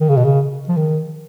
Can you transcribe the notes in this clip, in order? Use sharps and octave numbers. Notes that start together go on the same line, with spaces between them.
D#3
C#3
B2
C#3
F3
D#3